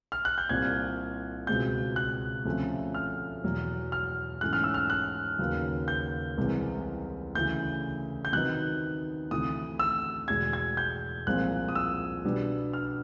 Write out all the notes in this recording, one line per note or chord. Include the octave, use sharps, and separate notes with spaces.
F6
F#6
G6
C2 A#2 G3 C4 G#6
C#2 B2 G#3 C4 G6
F#6
D2 C3 F3 A3 C#4
F6
E2 B2 F#3
F6
G#2 E3 A3 C#4 F#6
F6
E6
F6
F#6
D#2 C#3 F#3 B3
G6
C2 C3 E3 G#3 B3
D2 C#3 E3 G6
G6
C3 D#3 F#3 B3 D#4 F#6
D2 C3 E3 D#6
E6
E2 B2 G#3 G#6
G#6
G6
C2 A#2 F3 G#3 C4 F#6
D#6
E6
B2 G3 B3 D4
F6